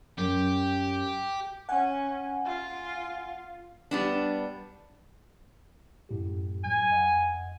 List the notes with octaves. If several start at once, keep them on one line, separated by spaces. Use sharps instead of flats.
F#2 G4
C#4 F#5 G#5
F4
G3 B3 D4
F#2 A2 G4
F#3 G#5 G6
F2 D#5 F#5